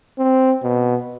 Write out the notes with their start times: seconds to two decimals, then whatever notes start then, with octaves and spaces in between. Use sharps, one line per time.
0.18 C4
0.63 B2